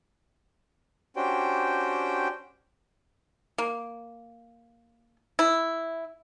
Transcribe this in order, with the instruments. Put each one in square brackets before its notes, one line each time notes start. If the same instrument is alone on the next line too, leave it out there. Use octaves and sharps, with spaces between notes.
[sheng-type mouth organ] C#4 D4 F#4 G4 C5 G5
[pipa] A#3
E4